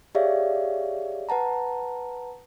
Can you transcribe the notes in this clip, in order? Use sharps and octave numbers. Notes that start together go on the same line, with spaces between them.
G4 G#4 C#5 D5 E5 F5
B4 F#5 A5 A#5